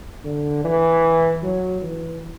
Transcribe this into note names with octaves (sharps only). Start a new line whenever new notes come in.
D3
E3
F#3
E3